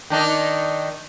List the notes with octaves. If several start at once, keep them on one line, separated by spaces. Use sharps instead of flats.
D#3 D4 D#4